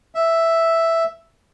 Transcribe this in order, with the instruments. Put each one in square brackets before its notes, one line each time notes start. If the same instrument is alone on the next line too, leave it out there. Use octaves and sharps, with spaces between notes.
[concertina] E5